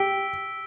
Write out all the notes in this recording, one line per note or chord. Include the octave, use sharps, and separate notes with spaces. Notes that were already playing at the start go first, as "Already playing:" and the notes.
Already playing: G4 E6 B6 D7 G7